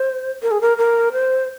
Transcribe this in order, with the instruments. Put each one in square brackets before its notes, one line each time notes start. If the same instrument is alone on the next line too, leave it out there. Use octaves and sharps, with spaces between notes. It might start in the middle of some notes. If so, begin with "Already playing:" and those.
Already playing: [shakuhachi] C5
A#4
G#4
A#4
A#4
C5